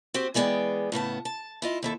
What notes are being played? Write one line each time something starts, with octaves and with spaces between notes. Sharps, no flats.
C4 F#4 G4 C5
E3 G#3 B3 G#4 D5 G5
A2 C#3 B3 A5
A5
E4 F4 D#5
D#2 E4 A4